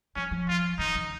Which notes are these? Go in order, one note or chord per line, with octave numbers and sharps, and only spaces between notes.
F3 C#4
F3
F4
D#3 D#4
C#3